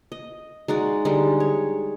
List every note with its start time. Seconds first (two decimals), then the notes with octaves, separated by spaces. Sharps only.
0.12 D#5
0.68 G#3 D#4 F#4 D5
1.05 D3 G3 G#3 D#4
1.40 C#5